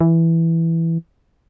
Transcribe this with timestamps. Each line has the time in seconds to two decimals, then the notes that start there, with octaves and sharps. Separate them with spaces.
0.01 E3